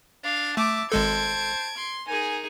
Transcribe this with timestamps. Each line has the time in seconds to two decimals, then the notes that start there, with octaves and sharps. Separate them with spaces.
0.24 D4 F5
0.57 A3 E5 A5 D6
0.92 G#1 G#3 A4 C5 A5 G#6 D7
1.76 C6
2.07 D#4 G#4 A#4 G#5